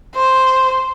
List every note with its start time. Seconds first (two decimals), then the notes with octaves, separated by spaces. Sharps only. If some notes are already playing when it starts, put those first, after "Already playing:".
0.15 C5